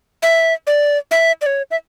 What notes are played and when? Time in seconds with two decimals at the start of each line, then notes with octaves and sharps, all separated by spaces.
0.23 E5
0.67 D5
1.11 E5
1.41 D5
1.46 C#5
1.71 E5